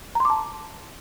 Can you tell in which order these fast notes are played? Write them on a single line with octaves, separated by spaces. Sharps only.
A#5 C6 D6 A5